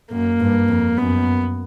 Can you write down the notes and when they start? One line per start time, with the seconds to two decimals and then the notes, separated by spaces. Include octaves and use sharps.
0.11 F#2 A#3
0.40 G2
0.68 F2
0.97 F#2 B3